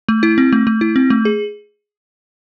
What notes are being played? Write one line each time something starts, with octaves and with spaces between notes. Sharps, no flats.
A3
E4
C4
A3
A3
E4
C4
A3
G#4